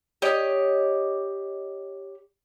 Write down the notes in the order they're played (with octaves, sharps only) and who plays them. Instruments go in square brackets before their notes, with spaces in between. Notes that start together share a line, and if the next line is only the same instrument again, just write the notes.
[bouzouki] G4 C#5 D#5